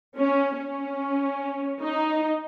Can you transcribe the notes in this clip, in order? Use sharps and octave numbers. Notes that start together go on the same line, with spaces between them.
C#4
C#4
D#4